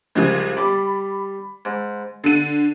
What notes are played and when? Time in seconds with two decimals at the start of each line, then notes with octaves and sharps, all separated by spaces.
0.16 C2 C#3 F3 G#3 G#5
0.57 G3 A5 B5 D6
1.65 G#2
2.24 D3 A4 F#5 D#7